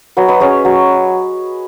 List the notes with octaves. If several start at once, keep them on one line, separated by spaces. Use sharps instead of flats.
F#3 B4 D#5
B4 D#5
C#4 G#4 C#5
F#3